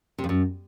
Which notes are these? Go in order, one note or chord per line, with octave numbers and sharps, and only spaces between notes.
C3
F2
F#2